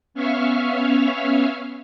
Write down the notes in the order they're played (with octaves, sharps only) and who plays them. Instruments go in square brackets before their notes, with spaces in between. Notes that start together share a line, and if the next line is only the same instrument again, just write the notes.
[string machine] B3 C#4 C#5 E5 F5 F6